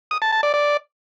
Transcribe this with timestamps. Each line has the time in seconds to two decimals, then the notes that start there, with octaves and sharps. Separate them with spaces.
0.11 D#6
0.22 A5
0.32 A5
0.43 D5
0.54 D5